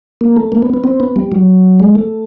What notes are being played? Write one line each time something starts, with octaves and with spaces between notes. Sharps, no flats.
A#3
A3
A#3
B3
B3
C4
B3
G3
F#3
G#3
A3